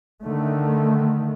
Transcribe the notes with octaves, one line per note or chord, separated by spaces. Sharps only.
D3 D#3 A3